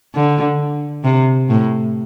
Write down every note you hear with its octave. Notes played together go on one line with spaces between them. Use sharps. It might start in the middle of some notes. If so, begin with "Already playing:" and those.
D3
C3
A2